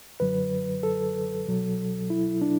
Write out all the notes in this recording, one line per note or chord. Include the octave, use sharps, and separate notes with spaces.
F#2 D3 F#3 B4
A4
C2 B2 F#3
E4
D4